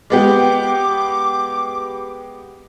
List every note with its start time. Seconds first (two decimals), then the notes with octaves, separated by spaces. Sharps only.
0.10 G#3 B3 G4 D6